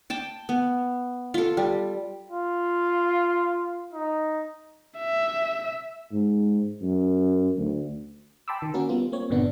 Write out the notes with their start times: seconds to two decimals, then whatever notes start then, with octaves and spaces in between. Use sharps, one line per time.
0.10 G5 A5 D6
0.49 B3
1.34 F4 A4
1.57 G3
2.30 F4
3.93 D#4
4.98 E5
6.13 G#2
6.82 F#2
7.57 D2
8.48 G5 A5 B5 C6 D6 E6
8.62 D#3
8.74 A#3 C#4 F#4 A#4
8.89 G3 B3 F4
9.12 A#3 C4 C#5
9.30 G2 A#2 D3 B3 D4